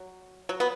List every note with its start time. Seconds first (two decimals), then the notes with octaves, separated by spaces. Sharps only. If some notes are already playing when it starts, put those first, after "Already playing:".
Already playing: F#3
0.49 F#3
0.60 B3